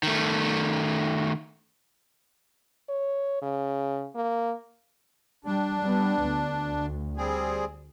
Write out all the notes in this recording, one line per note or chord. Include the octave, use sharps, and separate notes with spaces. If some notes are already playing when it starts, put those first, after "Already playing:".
D#3 A3
C#5
C#3
A#3
G3 D4
G3 B3
D2
G3 C4 G#4